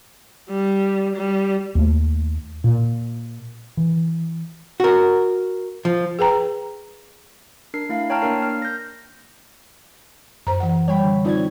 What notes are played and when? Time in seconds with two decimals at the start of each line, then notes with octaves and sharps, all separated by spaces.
0.49 G3
1.16 G3
1.75 D#2 A3
2.64 A#2
3.77 E3
4.80 F#4 A#4
5.85 F3
6.19 G#4 B4 G5 A#5
7.74 D4 A#4 C7
7.89 A3 E4 F5
8.10 C#5 G5 A5 A#5 F6
8.22 A#3 D4 A#4 C7
8.42 F6
8.62 G6 A#6
10.47 F#2 C5 A#5
10.60 E3 F#5
10.88 G3 C#5 G5 B5
11.04 D3
11.24 C4 D#4 F4 C#5 D5 G#6